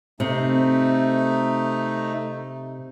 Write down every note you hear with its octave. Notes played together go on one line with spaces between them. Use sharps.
C3 A3 D#4